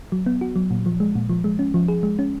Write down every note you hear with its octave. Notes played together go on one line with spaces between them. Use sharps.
F#3
B3
F#4
F#3
A#2
F3
G#3
A#2
F3
G#3
C#4
F3
G#4
G#3
C#4